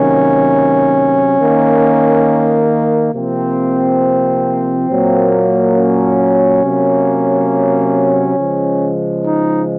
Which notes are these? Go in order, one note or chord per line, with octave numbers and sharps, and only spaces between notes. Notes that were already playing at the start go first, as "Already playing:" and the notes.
Already playing: C3 D#3 F#3 A#3 C#4
D#3 A#3
C3 F3 A#3 C4
A#2 F#3 A#3
C#4
C3 F#3 A#3
C#3 F3 G#3
D#4